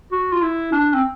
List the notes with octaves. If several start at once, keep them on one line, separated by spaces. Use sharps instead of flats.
F#4
F4
E4
D4
C4